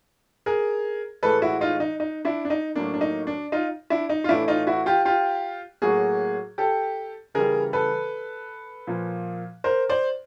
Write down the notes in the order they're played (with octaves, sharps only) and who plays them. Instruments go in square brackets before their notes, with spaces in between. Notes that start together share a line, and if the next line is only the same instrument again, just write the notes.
[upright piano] G#4 A#4
A2 E3 G#3 A4 B4
E4 F#4
D#4 F4
D#4
D#4
D4 E4
D4
D#4
A2 F#3 A#3 D4
D4
D#4
D4
D#4 F4
D4 E4
D#4
F4
A2 E3 A3 D4 E4
D#4 F4
E4 F#4
F4 G4
F4 G4
A2 F#3 A#3 F#4 G#4
G4 A4
C#3 E3 G3 G#4 A#4
A4 B4
A#2 F3 A#3
A#4 C5
C5 D5